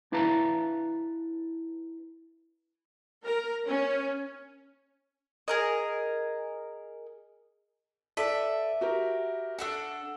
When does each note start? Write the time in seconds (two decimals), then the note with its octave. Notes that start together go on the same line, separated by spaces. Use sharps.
0.12 D4 E4 B4 F5 A5 A#5
3.25 A#4
3.68 C#4
5.48 G#4 A#4 D#5
8.17 A4 B4 D5 E5 D6
8.81 F#4 G4 A#4
9.59 D4 F#4 A4 F#5 E6